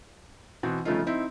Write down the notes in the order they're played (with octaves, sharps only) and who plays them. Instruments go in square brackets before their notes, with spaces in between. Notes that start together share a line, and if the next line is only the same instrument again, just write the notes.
[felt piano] B2 E3 B3 C4
G1 C#3 F3 A3 D#4 F4
C4 D#4 E4